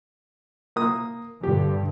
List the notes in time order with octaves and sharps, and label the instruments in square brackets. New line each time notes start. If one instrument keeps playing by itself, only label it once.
[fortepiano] A#3 D#6
[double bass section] G2 D3 [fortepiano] G4